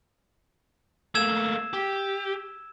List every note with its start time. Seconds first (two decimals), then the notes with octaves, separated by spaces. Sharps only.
1.15 A3 A#3 E6 G#6 E7
1.73 G4